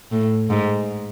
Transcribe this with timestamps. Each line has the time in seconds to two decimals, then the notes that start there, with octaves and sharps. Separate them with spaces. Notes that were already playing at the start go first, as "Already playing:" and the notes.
0.12 A2
0.50 G#2